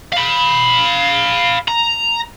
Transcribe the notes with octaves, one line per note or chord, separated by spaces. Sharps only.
F5 B5
A#5